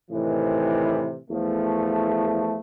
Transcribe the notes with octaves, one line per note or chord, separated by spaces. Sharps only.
A2 C3 D#3 E3
E2 F3 A3